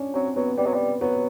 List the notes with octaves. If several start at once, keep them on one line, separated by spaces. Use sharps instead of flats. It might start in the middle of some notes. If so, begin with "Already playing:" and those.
Already playing: C#4 D4
F#3 C4
F#3 B3
G3 B3
F#3
G3
F#3 B3